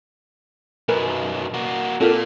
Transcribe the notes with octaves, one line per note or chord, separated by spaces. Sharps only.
B1 F#2 A#4 B4 G#5
A#3 F#4
A#2 C4 F4 A4 A#4